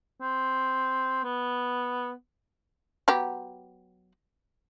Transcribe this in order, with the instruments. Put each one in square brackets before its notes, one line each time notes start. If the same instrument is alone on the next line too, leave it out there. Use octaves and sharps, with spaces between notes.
[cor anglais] C4
B3
[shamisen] F#3 B3 G4